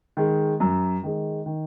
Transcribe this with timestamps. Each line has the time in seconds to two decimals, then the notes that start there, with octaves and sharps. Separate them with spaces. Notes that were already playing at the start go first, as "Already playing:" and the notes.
0.17 D#3 G#3
0.60 F#2
1.03 D#3 G#3
1.46 D#3